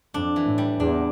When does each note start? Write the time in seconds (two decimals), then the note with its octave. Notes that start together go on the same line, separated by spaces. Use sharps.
0.14 F2 D4
0.36 E3
0.47 A2
0.58 G3
0.79 E2 D4